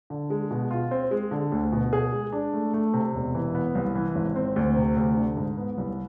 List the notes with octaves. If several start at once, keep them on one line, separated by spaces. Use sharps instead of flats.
D3
G#3
B2
F4
C4
G#3
D3
D2
B2
G#4
G#3
D4
A3
A3
C3
E1
E3
B3
C2
E3
G#1
C4
D2
C3
D2
D3
G#2
B3
C2